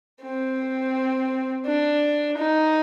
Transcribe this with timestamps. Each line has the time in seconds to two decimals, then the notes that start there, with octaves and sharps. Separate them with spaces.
0.22 C4
1.66 D4
2.38 D#4